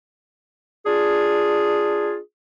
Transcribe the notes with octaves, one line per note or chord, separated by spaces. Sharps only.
D4 F4 G#4